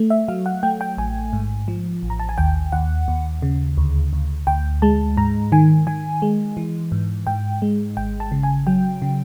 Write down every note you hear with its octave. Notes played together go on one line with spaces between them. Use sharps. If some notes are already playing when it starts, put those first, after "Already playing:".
Already playing: A3
E5
F#3 F5
F#5
A3 G5
G5
A1 G#5
G#2
F3
A1
A#5
A5
G#5
D#2 G5
D#2 F#5
D#2
C#3
D2
D2
D2 G5
G#3 A5
G#2 A#5
D#3 G#5
D#3 G#5
G#3
E3
G#2
G#2 G5
G#3
G#1 G5
A5
C#3
G#5
F#3 G5
C#3